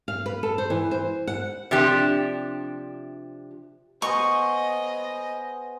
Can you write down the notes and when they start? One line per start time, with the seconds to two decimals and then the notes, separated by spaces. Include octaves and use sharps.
0.08 F5
0.26 B4
0.43 A4
0.58 C5
0.70 E3
0.91 C5
1.27 F#5
1.71 C3 F3 D4 G4
4.02 B3 G#4 C5 D#5 C#6